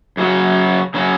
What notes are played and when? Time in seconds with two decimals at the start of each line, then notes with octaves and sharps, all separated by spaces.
0.17 F#2 C#3 F#3 C#4 F#4
0.94 C#3 F#3 C#4 F#4